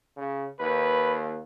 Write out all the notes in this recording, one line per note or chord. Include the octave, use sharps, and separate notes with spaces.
C#3
D#2 B4